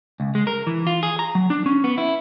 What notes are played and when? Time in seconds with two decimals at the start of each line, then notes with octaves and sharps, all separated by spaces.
0.20 C#2
0.35 G#3
0.47 A#4
0.67 E3
0.87 F4
1.03 G#4
1.19 A#5
1.35 F#3
1.50 D4
1.66 C#4
1.84 B3
1.98 E4